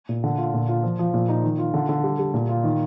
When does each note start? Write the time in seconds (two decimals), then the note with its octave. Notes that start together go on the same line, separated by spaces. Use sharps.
0.09 A#2
0.24 D3
0.38 F4
0.54 A#2
0.69 F4
0.83 F3
0.99 F3
1.14 A#2
1.29 D#4
1.44 D#3
1.59 F4
1.74 D3
1.89 D3
2.04 G3
2.19 G3
2.34 A#2
2.49 F4
2.64 D#3